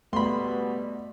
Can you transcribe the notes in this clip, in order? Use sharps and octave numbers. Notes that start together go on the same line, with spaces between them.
B2 G3 A3 B3 B5 C6